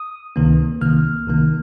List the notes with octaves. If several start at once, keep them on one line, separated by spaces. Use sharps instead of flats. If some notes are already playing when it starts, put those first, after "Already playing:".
Already playing: D#6
C#2 C3 D#3 A#3
C2 C3 D#3 A#3 F6
C2 C3 D#3 A#3